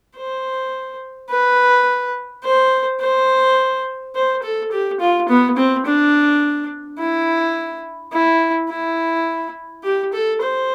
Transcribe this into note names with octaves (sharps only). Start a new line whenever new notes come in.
C5
B4
C5
C5
C5
A4
G4
F4
B3
C4
D4
E4
E4
E4
G4
A4
C5